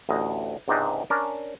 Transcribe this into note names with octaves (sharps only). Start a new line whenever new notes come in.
A1 D2 D#5
C#2 G#2 C3 D4 D#4
C#4 D4 A#4